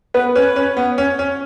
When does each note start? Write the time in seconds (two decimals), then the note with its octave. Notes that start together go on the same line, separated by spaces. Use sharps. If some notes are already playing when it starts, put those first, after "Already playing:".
0.14 B3 B4
0.35 C#4 B4
0.56 C#4
0.77 B3
0.98 C#4
1.19 C#4